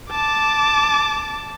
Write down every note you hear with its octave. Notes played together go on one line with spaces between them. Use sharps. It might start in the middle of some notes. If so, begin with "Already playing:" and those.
A5 D6